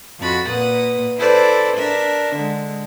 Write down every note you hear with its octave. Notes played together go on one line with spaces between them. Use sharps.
F2 F3 F#4 B5 A6
A#2 A#3 B4 F#5 D#6
E4 A4 B4 C5 D5
D4 A#4 E5
D3 G#3